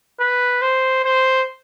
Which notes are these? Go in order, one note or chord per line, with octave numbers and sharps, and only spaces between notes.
B4
C5
C5